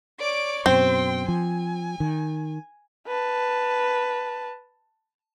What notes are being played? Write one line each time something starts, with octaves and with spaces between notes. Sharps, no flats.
C#5 D5 D6
F#2 B2 C4 G5 C6
F3 G#5
D#3
B4 A5